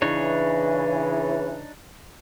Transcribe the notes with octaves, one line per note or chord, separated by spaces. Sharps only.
C#3 E3 D4 D#4 C#5